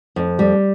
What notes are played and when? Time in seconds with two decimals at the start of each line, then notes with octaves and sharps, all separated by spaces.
0.16 F2
0.39 G3